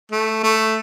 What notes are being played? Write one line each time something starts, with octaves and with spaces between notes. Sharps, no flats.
A3
A3